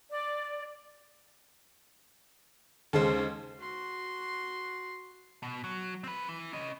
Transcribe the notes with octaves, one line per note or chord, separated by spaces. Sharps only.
D5
D#2 C#3 G#3 A4 C5
F#4 C6
B2
F#3
C4 B4
E3
C#4 D#5